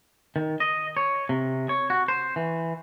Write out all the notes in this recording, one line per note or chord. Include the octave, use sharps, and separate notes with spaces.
D#3
D#5
C#5
C3
C#5
F#4
C5
E3